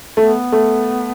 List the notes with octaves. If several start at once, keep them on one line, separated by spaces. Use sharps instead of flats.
A3 B3
A3